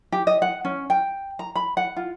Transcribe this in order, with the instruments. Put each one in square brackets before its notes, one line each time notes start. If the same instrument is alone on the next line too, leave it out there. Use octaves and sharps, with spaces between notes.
[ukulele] G4
D#5
F#5
C#4
G5
A#5
B5
F#5
F4